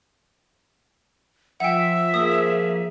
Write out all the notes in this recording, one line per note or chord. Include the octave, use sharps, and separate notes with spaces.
F3 E5 F#5 G5
F3 A#3 G#4 D#6